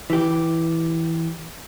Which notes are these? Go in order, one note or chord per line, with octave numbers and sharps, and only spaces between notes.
E3 G4